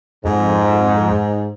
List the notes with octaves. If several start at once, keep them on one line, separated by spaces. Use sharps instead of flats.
F2 G#2